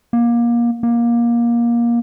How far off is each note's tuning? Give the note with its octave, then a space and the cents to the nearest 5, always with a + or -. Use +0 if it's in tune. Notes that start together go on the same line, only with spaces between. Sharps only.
A#3 +25
A#3 +20